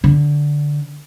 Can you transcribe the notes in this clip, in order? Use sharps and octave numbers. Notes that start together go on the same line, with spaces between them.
D3